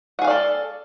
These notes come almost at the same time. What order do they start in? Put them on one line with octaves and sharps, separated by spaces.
F#5 G#4 F5 D5 A4